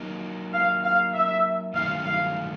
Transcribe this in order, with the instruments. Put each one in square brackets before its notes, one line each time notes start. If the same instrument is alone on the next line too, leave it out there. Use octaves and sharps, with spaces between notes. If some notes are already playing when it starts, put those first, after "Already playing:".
Already playing: [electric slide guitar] F#3 A#3 D#4
[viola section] F5
F5
E5
[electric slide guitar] G2 D#3 F#3 A3 [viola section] F5
[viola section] F5